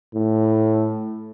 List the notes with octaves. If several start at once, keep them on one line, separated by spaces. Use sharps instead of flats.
A2